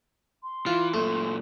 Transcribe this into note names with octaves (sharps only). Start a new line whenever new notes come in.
C6
E3 F4
F#2 A#2 A3